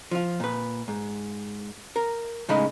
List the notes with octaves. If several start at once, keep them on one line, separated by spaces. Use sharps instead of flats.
F3 F4
A#2 B4
G#2
A#4
A2 C#3 G#3 D#4 G#4 B5